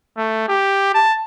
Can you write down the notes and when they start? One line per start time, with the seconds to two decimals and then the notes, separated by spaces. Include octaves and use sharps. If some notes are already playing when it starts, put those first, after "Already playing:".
0.17 A3
0.49 G4
0.94 A5